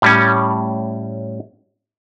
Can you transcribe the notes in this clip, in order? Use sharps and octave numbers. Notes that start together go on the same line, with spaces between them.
A2 G3 C#4